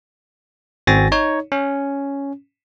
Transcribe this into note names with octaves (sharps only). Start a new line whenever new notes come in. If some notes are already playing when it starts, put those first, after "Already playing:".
G#1 C4 F#4 G#5 A6 A#6
D#4 C#5
C#4